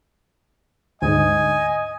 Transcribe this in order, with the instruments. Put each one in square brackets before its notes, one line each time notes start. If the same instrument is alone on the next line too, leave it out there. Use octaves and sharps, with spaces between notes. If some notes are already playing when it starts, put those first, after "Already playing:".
[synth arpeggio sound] D2 G#2 [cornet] D#5 [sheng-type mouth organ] G#5